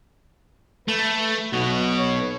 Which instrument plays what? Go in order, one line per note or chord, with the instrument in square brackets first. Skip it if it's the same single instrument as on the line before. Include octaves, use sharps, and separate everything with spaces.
[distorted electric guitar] A3 [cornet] B4
[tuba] B1 [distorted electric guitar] B2 [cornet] F#4
[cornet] C#5